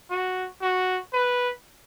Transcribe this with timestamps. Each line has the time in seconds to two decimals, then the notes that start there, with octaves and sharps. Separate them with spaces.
0.10 F#4
0.62 F#4
1.13 B4